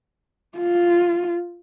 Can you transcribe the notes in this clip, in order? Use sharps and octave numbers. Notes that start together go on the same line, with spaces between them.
F4